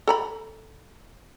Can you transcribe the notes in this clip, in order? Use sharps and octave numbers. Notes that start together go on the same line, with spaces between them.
A4 A#5 B5